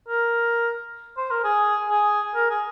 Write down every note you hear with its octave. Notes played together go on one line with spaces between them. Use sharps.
A#4
C5
A#4
G#4
G#4
A#4
G#4